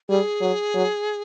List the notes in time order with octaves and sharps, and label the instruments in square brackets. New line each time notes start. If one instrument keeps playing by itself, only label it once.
[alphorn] G3 [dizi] G#4
[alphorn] F#3
F#3